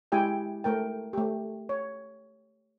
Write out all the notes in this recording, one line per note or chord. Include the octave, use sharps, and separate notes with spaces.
G#3 E4 G4 G5 G#5
A3 A#4 G5
A3 G4
C#5